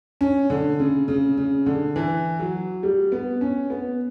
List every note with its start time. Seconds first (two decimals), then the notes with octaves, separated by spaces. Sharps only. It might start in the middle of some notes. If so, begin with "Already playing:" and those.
0.21 C#4
0.50 D3
0.79 C#3
1.08 C#3
1.38 C#3
1.66 D3
1.96 E3
2.39 F#3
2.83 G3
3.12 B3
3.41 C#4
3.70 B3